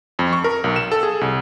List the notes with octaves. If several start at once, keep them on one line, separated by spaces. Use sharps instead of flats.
F2
C#6
A#4
B1
E7
A4
G#4
C2